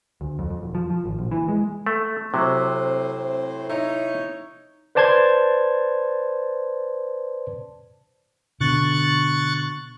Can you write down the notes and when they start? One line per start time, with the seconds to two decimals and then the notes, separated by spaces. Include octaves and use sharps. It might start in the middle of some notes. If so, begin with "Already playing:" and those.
0.21 D2
0.39 F2
0.50 F2
0.63 E1
0.75 F3
0.90 F3
1.05 G#1
1.19 A#1
1.32 E3
1.48 G#3
1.86 A3
2.34 A2 C3 F#3 C4 C5
3.70 D#4 E4 C#5
4.95 B4 C5 D5 A5 C6 G#6
8.60 B2 D3 C#6 F#6 A6